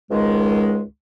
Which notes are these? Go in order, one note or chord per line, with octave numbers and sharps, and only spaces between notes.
C#2 G#2 D#3 G#3